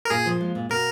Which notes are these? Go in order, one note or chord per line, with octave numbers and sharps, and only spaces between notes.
A#4
A#2 G#4
F3
G#3
A#2
B2 A#4